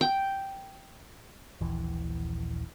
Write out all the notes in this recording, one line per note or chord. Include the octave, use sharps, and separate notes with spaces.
G5
D#1 A#1 E3